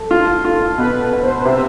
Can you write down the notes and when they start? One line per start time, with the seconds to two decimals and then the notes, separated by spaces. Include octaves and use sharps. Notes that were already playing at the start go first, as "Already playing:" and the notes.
Already playing: A4
0.11 F4
0.45 F4
0.78 B2 B4
1.01 B4
1.12 B2
1.23 C5
1.45 C3 E5